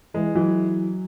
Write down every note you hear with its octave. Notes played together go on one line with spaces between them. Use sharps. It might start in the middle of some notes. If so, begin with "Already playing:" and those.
E3 G#3
E3 F#3